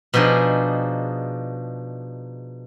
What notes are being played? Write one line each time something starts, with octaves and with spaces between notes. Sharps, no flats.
B2 F3 D4 D#4 G#4